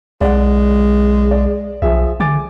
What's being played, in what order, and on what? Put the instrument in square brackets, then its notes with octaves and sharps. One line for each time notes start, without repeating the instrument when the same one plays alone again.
[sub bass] B1 [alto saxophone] G#3 [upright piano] D5 F#5
[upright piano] D5
[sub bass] B1 [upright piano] F3 G#4 E5
[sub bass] D3 [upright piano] G#5 D6 A6